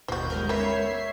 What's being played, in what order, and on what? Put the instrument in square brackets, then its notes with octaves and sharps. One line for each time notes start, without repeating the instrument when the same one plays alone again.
[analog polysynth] G1 D#2 G6 [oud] B2 [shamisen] F3 F#4
[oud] G#3 B3 A#4
[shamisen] A#3 C#4 B4 [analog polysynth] C#5 E5 C7